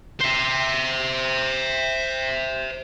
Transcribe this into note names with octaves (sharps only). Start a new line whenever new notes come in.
C5 E5